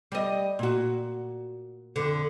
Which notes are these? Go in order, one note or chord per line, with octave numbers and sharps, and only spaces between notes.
G3 D#5
A#2 F#4
F2 D3